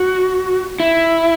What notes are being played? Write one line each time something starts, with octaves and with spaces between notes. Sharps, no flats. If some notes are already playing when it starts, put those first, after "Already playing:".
Already playing: F#4
E4